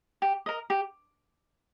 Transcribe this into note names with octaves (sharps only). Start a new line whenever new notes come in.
G4
A#4 D#5
G4